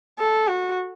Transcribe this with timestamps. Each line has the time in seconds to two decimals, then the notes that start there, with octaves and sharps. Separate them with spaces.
0.19 A4
0.48 F#4